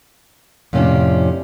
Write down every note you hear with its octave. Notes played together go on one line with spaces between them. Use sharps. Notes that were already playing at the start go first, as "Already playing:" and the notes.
F2 A2 C3 C#4 D4